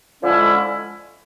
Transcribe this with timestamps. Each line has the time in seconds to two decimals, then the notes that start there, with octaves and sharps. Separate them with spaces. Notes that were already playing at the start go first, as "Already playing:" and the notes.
0.21 D3 F3 G#3 C#4 E4